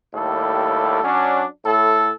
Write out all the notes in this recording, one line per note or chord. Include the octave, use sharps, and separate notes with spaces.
D#2 A2 G3 A4
F#3 C#4 D4
A2 A4